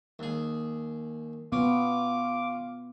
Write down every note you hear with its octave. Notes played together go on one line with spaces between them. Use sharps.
D#2 G#4
B3 C#4 F4 D6